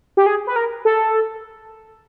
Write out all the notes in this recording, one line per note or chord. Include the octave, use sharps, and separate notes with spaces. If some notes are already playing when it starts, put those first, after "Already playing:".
G4
G#4
B4
A#4
A4